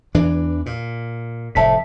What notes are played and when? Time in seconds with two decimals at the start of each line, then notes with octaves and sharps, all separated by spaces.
0.15 E2 E3 D4
0.66 A#2
1.55 F1 A2 E5 A5 B6